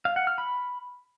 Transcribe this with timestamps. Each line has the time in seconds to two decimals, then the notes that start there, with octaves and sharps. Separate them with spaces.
0.05 F5
0.16 F#5
0.27 F6
0.38 B5